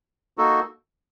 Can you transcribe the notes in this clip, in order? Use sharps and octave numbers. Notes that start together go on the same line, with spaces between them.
A#3 D#4 F#4 A4